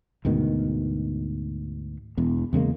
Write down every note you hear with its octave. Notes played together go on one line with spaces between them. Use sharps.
D2 G#2 B2 D#3
E1 E2
E2 C#3 G#3 A#3